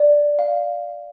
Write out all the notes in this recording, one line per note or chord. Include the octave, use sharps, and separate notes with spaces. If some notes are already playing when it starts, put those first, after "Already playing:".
Already playing: D5
F5